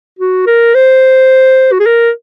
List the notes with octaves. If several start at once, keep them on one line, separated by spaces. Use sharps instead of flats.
F#4
A#4
C5
F#4
G#4
A#4